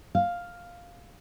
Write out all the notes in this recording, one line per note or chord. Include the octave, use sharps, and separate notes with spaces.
F5